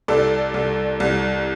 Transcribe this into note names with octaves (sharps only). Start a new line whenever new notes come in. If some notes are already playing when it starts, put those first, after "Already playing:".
C2 A4 D5
C2
C2